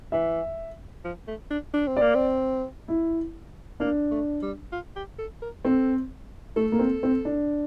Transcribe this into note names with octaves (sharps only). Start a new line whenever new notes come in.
E3 E5
F3
A3
D4
D4
C4
A#3 D5
C4
E4
A#3 D4
A3
G3
F4
G4
A4
A#4
C4 A4
A3 A4
A#3
C4
C4
D4